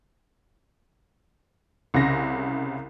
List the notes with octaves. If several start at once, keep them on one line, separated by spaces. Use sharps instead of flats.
C2 C#3 A#6